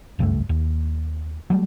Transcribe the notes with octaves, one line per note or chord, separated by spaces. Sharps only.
F#1 C#2 G2 A3
D#2
F#3 G3 A3